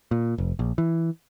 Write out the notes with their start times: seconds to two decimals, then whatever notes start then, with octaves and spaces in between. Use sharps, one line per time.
0.11 A#2
0.38 F1
0.59 A#1
0.78 E3